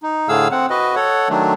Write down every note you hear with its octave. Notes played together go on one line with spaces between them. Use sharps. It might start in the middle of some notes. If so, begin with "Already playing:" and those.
D#4
A2 D3 A3 G#4 F5 E6
C4 F#5
F#4 B4 D#5
A4 C#5 F#5
D#3 F#3 A3 D4